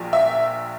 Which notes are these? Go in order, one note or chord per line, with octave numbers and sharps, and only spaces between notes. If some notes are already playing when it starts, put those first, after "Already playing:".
Already playing: A#1 A#2
E5